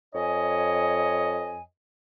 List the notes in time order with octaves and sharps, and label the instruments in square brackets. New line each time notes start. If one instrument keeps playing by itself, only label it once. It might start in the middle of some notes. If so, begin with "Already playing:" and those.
[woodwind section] F2 C#5 D#5 G#5